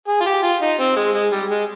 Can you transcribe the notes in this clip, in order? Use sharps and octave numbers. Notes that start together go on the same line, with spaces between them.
G#4
F4
G4
F4
D#4
C4
G#3
G#3
G3
G#3